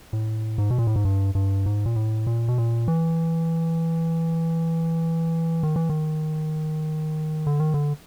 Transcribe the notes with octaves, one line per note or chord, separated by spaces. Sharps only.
A2
G#2
B2
A#2
A2
G#2
G2
G2
G#2
A#2
A2
A#2
B2
A#2
E3
D#3
E3
D#3
D3
D#3
D3